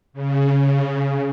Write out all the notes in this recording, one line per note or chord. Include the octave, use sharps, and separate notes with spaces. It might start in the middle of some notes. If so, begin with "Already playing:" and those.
C#3